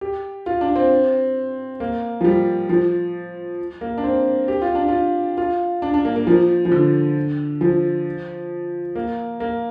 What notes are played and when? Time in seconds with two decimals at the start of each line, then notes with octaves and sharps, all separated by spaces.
0.01 G4
0.46 F4
0.61 D4
0.76 C4
1.80 A#3
2.21 F3
2.25 G3
2.69 F3
3.81 A#3
3.98 D4
4.04 C4
4.48 G4
4.62 F4
4.75 D4
4.88 F4
5.38 F4
5.82 D4
5.94 D4
6.05 A#3
6.16 A#3
6.27 F3
6.65 F3
6.72 D3
7.61 F3
8.95 A#3
9.40 A#3